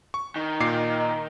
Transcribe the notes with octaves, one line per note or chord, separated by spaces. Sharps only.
C#6
D#3
A#2 D6 C7